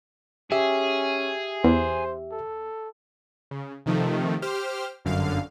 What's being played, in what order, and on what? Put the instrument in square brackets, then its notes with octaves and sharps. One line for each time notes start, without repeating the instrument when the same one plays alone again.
[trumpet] C#4 [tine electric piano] G4 E5 [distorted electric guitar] G#4
[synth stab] E2 [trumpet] C5
[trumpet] A4
[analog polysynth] C#3
C3 D#3 F3 A3
G4 C5 F6
G1 F#2 D3 F5